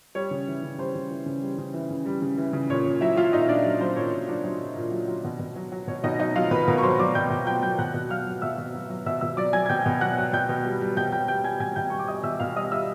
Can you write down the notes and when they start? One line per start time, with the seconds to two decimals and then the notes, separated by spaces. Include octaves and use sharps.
0.15 G3 C#5
0.31 C#3
0.47 E3
0.63 C#3
0.78 G3 C5
0.95 C#3
1.10 E3
1.26 C#3
1.42 G3
1.58 C#3
1.74 E3
1.91 C#3
2.06 G3
2.22 C#3
2.37 E3
2.53 C#3
2.70 A#2 C#5
2.86 A#2
3.01 F#3 E4 E5
3.17 F#3 F4 F5
3.33 A#2 D#4 D#5
3.48 A#2 D4 D5
3.65 F#3
3.81 F#3 C5
3.96 A#2 C#5
4.13 A#2
4.28 F#3 D4 D5
4.44 F#3
4.60 A#2
4.76 A#2
4.92 F#3
5.08 F#3
5.24 B2
5.39 B2
5.56 F#3
5.72 F#3
5.87 B2 C#5
6.04 B2 D#4 D#5
6.19 F#3 D#4 D#5
6.36 F#3 F4 F5
6.51 B2 B4 B5
6.68 B2 A#4 A#5
6.78 C#6
6.82 F#3 C5 C6
6.99 F#3 D5 D6
7.15 B2 G5 G6
7.30 B2
7.47 F#3 G5 G6
7.62 F#3 G5 G6
7.79 B2 F#5 F#6
7.94 B2
8.10 F#3 F5 F6
8.26 F#3
8.42 B2 E5 E6
8.58 B2
8.74 F#3
8.89 F#3
9.06 B2 E5 E6
9.21 B2 E5 E6
9.37 F#3 D5 D6
9.53 F#3 G#5 G#6
9.66 G#6
9.69 B2 G5 G6
9.86 B2
10.01 F#3 F#5 F#6
10.18 F#3
10.33 B2 G5 G6
10.49 B2
10.65 G3
10.81 G3
10.97 B2 G5 G6
11.12 B2 G5 G6
11.28 G3 G5 G6
11.44 G3 G#5 G#6
11.60 B2 G#5 G#6
11.76 B2 G5 G6
11.90 G3 C#6
11.99 D6
12.08 G3 D#5 D#6
12.23 B2 E5 E6
12.39 B2 F5 F6
12.56 G3 D#5 D#6
12.72 G3 E5 E6